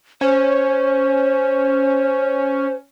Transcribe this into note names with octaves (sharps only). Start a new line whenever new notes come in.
C#4 C5